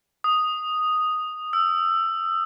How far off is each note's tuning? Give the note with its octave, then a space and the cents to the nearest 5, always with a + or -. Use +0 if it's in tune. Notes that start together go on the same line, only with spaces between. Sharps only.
D#6 +0
E6 +20